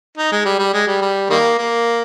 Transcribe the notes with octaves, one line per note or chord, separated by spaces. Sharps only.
D#4
G#3
G3
G3
G#3
G3
G3
D#3 G3 A#3
A#3